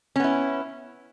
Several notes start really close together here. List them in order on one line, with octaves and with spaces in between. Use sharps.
C#4 B3 E4